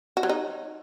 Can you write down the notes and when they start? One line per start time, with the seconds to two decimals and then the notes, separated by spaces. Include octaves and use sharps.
0.17 F#4
0.23 F#3
0.29 D#4